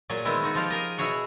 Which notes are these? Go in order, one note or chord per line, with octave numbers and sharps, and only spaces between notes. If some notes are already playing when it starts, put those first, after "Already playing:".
A#2 F#3 G#4
D#3 G#3 B3 C4 E4
B3 D#4 F#4
F3 F4 G4
G#4 A#4 D#5
B2 E4 F#4 G#4 C#5 F#5